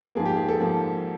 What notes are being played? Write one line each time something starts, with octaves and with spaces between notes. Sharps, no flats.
G#2 F3 A#3 G#4
G4
G#4
A4
G#2 F3 A#3